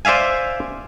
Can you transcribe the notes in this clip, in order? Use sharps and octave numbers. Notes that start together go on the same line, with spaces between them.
C5 D5 E5 F5 G#5